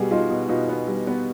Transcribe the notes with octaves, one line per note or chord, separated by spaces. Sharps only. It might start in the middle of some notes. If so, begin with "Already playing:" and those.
Already playing: B2 G3 F#4 G#4
G3 D#4 F4
B2
B2 D#4 F4
B3
G3
B3